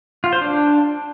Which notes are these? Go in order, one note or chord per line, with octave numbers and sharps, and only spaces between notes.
F4
C5
D4